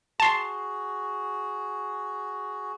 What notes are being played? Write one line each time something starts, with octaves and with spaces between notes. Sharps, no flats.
F#4 G#4 A5 C6